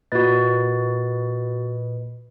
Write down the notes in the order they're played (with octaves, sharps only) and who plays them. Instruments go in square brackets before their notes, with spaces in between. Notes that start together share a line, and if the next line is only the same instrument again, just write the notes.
[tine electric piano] A#2 B4 D#5 [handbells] F#4 A6